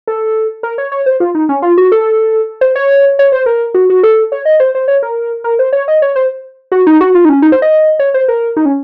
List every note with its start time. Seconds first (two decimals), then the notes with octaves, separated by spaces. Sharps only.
0.07 A4
0.63 A#4
0.78 C#5
0.92 C#5
1.06 C5
1.20 F4
1.35 D#4
1.49 C#4
1.62 F4
1.78 F#4
1.92 A4
2.61 C5
2.76 C#5
3.19 C#5
3.32 C5
3.46 A#4
3.74 F#4
3.90 F#4
4.03 A4
4.32 C#5
4.45 D#5
4.60 C5
4.75 C5
4.88 C#5
5.03 A#4
5.44 A#4
5.59 C5
5.73 C#5
5.88 D#5
6.02 C#5
6.16 C5
6.72 F#4
6.87 D#4
7.01 F#4
7.15 F4
7.25 D#4
7.29 C#4
7.42 D#4
7.52 C5
7.62 D#5
7.99 C#5
8.14 C5
8.28 A#4
8.57 D#4
8.65 C#4